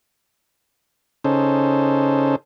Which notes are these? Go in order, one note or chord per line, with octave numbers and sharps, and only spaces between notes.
C#3 C#4 D#4 A4 C5